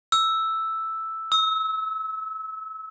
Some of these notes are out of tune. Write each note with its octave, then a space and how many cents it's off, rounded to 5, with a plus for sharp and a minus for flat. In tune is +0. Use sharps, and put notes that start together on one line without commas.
E6 +0
E6 -30